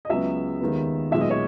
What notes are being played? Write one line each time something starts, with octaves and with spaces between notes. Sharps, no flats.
D#5
C#2 C#3 F#3 B3 E5
D#2 D#3 G#3 B3
B1 A#2 G#3 B3 E5
D#5
C#5